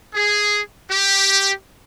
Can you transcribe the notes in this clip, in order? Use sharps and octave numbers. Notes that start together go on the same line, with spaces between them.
G#4
G4